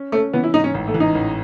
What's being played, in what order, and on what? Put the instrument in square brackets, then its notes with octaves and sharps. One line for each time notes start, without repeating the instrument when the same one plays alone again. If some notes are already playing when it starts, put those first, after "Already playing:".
Already playing: [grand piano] C#4
[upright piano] A3 [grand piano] C#4
[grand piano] E3 [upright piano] B3
[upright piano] E4
[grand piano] G#2 [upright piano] D#4
[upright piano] C#4
[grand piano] A1
[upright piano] A3
[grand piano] E3
[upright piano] D#4
[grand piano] A1